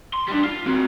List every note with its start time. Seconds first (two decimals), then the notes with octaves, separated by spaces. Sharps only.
0.14 C6
0.28 G3 D4
0.44 F4
0.67 C4 F#4